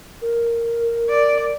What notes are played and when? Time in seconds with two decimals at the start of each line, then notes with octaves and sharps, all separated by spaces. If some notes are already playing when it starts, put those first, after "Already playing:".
0.22 A#4
1.09 D5